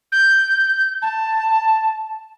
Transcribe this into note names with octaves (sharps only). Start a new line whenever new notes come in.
G6
A5